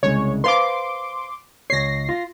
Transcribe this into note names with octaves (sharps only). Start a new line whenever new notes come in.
C2 C#3 G#3 C#5
B4 C5 F5 C6 D6
C#2 C#5 A#6 C7
F4